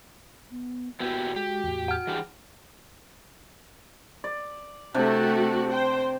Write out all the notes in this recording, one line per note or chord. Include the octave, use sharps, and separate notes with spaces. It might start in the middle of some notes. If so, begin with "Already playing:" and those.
B3
A#2 B3 E4 F#4 G4
G#3 G4
E2 A2
F#5 F6
E3 D4 G4 G#4
D5
C3 A3 D4 F#4 G4
C5 G5